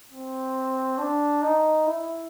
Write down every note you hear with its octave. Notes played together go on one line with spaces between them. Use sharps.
C4
D4
D#4
E4